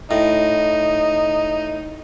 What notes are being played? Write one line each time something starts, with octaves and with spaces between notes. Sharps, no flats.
A2 D#4